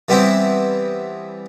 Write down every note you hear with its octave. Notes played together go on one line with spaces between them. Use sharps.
E3 G3 B3 C4 E4